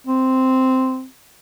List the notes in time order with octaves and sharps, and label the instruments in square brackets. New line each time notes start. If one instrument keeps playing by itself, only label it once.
[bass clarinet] C4